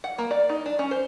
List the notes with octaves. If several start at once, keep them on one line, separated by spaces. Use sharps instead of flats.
F#5
A#3
D5
D#4
D4
C#4
C5